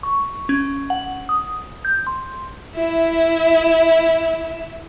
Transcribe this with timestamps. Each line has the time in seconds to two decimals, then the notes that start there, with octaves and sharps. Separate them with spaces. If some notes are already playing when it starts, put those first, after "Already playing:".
0.03 C#6
0.49 C#4
0.90 F#5
1.29 D#6
1.85 G6
2.07 C6
2.75 E4 E5